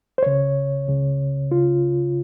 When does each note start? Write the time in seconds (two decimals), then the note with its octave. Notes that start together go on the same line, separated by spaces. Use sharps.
0.18 C5
0.22 C#2 C#3 C#5
0.87 C#2 C#3
1.52 C#3 F4